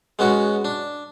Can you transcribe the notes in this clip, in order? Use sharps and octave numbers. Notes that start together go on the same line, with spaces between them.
G#3 B3 C#4 F#4
D4